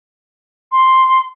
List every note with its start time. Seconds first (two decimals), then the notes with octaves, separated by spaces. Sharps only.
0.72 C6